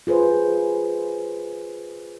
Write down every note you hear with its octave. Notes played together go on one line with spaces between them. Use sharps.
F4 G#4 B4 C5